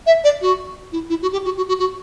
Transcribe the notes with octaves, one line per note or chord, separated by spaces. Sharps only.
E5
D5
F#4
E4
E4
F#4
G4
F#4
F#4
F#4
F#4